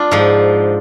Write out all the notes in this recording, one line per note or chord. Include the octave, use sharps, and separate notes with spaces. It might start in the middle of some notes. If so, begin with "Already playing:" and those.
Already playing: D4 F4
G#2 F3